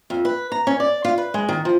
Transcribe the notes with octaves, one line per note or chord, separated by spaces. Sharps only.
F2
B4
A#5
C#4
D5
F4
B4
G#3
D#3
F3